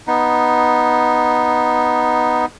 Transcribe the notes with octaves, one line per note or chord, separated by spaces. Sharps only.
B3 D#4